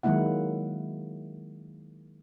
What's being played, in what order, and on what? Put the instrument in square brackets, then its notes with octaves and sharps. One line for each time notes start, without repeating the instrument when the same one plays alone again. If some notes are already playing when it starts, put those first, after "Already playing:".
[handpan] D#3 F#3 G#3 A#3 E4 F#5